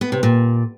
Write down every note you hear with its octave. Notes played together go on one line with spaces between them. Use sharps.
B3
C3
A#2